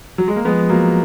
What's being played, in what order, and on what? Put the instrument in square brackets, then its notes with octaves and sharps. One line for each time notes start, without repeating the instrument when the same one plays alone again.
[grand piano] F#3
G#3
A#3
[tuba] F3 [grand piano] G#3 B3
[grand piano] F#3 A#3